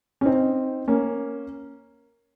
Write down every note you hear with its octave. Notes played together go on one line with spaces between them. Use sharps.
C#4
C4 D#4
A#3 C#4